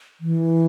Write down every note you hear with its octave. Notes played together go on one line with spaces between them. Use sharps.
E3